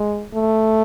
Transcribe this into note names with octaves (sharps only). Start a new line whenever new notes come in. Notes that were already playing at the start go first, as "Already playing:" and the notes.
Already playing: G#3
A3